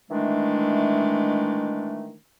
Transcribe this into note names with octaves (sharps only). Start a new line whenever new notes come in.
D#3 E3 G#3 A3 D4